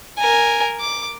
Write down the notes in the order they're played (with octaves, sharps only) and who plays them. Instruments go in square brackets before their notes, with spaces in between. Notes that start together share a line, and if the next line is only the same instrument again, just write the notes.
[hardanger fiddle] A#4 G#5
D6